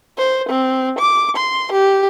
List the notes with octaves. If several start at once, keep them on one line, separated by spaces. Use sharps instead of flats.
C5
C4
D6
C6
G4